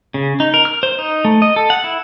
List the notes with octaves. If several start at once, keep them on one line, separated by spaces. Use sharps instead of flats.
C#3
D#4
A#4
F6
C5
D#4
A3
D#5
A4
F#5
E4